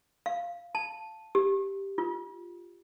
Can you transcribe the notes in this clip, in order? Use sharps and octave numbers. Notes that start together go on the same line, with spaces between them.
F5
A5
G4
F4